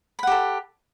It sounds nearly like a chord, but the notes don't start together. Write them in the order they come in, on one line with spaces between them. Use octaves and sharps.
B5 F#5 G4 A4